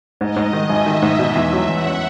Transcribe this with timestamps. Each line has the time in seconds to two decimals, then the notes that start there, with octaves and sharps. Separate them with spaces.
0.20 G#2 D#5
0.36 G#2
0.53 D#3
0.69 G#1 E5
0.86 D#3
1.02 G#2
1.19 B2
1.35 E2
1.52 F#3
1.68 E2 F#5
1.84 C#4